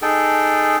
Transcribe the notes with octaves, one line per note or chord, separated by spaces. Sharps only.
D#4 G#4 A4 G5